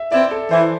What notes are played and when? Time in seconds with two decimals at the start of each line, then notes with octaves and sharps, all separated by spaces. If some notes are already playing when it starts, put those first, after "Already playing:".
Already playing: E5
0.12 C4 E4 D5
0.31 A4
0.51 E3 C5